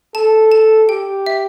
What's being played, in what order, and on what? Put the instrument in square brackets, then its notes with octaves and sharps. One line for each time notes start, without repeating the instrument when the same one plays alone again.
[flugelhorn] A4 [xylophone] A5
[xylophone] A5
[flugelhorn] G4 [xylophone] G5
[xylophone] E5